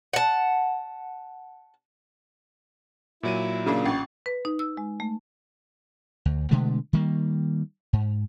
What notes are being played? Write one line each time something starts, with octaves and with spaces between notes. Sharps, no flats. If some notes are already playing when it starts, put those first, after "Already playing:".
F#5 A5
A#2 F#3 E4 D#7
C#3 A#3 D4 F4
A1 C#4 C#6
B4
D#4
E6
G#3
A3
D2
B2 D3 G#3 A3
D#3 G3 A#3
G#2